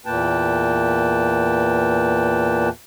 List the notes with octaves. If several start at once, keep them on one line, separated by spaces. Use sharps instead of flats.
E2 A#2 A#3 B4 G5 A5